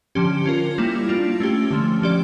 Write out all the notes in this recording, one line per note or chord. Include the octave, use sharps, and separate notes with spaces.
D3 F3 C#4 G4
C#4 F4 A#4
G3 A#3 E4
A#3 D4 F4
A3 C#4 G4
D3 F3 A3
F3 C#4 G4 D5